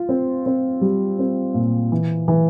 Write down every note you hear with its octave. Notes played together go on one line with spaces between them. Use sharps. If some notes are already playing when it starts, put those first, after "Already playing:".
Already playing: F4
C4
C4
G3
C4
A#2
E3
E3